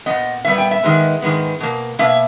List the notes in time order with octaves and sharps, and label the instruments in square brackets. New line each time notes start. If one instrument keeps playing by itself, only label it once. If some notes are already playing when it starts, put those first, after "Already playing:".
[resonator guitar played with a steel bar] A#2 G3 B3 D#5
A#2 G3 B3 E5
G5
E5
G#2 D#3 G#3 B3
G#2 D#3 G#3 B3
B2 A#3
B2 A#3 E5